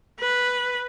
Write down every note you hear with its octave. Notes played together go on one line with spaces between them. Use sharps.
B4